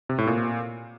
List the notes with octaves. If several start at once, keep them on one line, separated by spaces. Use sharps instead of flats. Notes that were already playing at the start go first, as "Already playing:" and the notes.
C3
A2
A#2